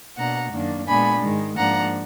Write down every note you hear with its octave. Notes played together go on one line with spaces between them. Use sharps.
B2 A#3 D4 F#5 A#5
F#2 D#3 A#3 D4
A#2 G#3 B3 D4 G#5 B5
G#2 D#3 G#3
G#2 F3 A#3 D4 F#5 A#5